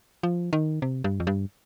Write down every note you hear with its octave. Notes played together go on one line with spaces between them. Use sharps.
F3
D#3
C3
G2
F2
G2